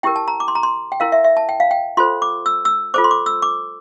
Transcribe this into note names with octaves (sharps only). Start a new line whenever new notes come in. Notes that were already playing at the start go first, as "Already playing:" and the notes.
E4 G4 A#4 G5
A5
A#5
D6
C6
A#5
C6
G5
E4 A#4 F5
E5
E5
A5
G5
F5
G5
F4 A4 C5 C6
D6
E6
E6
F4 A4 C5 D6
C6
D6
E6
D6